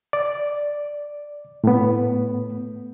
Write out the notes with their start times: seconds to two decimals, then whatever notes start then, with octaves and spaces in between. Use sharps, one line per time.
0.13 D5
1.64 A2 B3